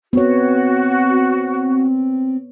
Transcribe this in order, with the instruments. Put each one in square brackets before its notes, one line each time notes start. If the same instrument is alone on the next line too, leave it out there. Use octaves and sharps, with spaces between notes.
[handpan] B3 C#5 [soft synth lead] C4 [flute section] F#4